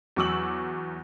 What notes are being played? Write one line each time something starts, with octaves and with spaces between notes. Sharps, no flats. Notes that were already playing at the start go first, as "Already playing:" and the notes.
E2 F#3 C#6 D6 E6 F#7